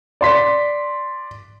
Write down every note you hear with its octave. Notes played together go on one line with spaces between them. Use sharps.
D5 C6 B6